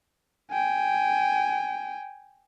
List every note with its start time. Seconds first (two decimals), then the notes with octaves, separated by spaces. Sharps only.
0.51 G5 G#5